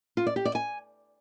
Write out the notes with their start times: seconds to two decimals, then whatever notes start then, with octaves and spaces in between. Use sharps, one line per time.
0.17 F4
0.27 D5
0.36 G4
0.45 D5
0.55 G#5